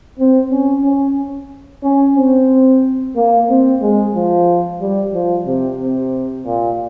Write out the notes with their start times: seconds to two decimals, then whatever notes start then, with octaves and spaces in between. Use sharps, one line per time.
0.19 C4
0.51 C#4
0.84 C#4
1.83 C#4
2.16 C4
3.16 A#3
3.49 C4
3.82 G#3
4.15 F3
4.81 G3
5.14 F3
5.46 C3
5.79 C3
6.46 A#2